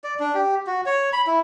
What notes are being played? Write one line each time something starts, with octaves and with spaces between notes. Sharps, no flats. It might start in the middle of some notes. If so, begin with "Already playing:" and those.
D5
D4
G4
F#4
C#5
B5
E4